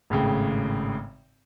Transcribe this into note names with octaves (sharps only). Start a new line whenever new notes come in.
G#1 A2 C#3 G5